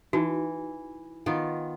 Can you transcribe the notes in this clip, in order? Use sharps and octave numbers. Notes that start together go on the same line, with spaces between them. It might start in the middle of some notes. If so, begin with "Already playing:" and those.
E3 D#4 F#4
D#3 B3 F4